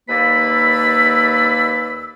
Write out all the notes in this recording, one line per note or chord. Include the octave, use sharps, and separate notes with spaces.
D#2 A#3 B4 D5 B5 E6